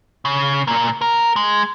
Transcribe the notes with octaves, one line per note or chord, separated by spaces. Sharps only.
C#3
A#2 A#3
A#4
G#3